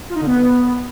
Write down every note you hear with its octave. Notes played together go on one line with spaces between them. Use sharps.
F4
D#4
D3
B3